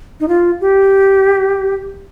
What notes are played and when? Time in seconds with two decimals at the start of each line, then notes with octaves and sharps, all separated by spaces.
0.20 D#4
0.28 F4
0.61 G4